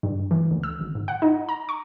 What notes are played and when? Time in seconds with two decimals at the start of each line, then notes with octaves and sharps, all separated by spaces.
0.03 G2
0.31 E3
0.51 D2
0.63 E6
0.80 G#1
0.95 G#2
1.08 F#5
1.22 D#4
1.49 A#5
1.69 C#6